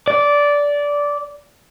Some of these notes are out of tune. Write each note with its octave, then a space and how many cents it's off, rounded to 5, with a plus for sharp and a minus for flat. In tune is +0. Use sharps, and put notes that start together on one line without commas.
D5 -15